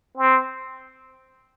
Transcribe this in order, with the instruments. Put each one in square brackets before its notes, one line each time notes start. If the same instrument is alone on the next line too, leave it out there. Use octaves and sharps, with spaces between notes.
[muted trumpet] C4